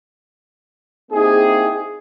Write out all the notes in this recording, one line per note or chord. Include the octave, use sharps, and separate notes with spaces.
A#3 C4 D#4 E4 G4 G#4